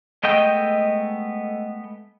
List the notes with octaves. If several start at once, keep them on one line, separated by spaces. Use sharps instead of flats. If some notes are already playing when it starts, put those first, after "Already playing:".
G#3 A3 B3 D#5 G5